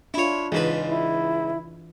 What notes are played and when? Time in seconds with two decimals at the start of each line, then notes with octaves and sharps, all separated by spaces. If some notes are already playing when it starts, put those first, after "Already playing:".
0.14 D4 E4 F4 C#5
0.52 C#2 G#2 E3 B4
0.88 E4